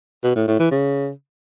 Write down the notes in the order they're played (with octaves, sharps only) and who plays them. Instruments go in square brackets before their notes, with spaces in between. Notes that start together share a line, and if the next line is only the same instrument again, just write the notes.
[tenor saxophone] B2
A2
A2
E3
C#3